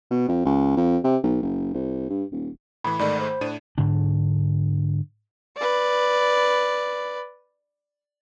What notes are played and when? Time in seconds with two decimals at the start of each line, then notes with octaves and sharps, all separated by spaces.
0.11 B2
0.28 F2
0.45 C#2
0.77 F2
1.04 C3
1.23 B1
1.43 F#1
1.74 C2
2.10 G2
2.32 D#1
2.84 A2 E3 B5
2.99 G#2 D#3 A3 D5
3.20 C5
3.41 A2 D4 D#7
3.78 G#2 D3 D4
5.57 B4 D5